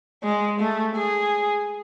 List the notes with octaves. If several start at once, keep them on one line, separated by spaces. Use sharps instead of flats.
G#3
A3
G#4